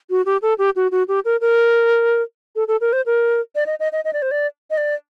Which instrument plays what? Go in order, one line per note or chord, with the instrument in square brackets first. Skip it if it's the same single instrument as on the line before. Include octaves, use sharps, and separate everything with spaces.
[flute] F#4
G4
A4
G4
F#4
F#4
G4
A#4
A#4
A4
A4
A#4
C5
A#4
D5
D#5
D#5
D#5
D#5
D5
C5
D5
D#5
D5